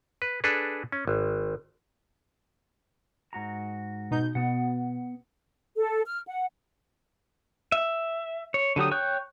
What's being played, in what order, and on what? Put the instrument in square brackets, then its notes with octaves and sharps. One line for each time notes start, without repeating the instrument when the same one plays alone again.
[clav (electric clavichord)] B4
D4 G#4 A4 B4
C#4
G#1
[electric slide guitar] G#2 F#4 A#5
[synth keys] B2 D#4 G6
[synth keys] B2 [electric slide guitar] B3 F#5
[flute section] A4
F6
F#5
[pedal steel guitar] E5
C#5
D3 F#3 G4 D#6
C#5 G5 C#6 F#6 G6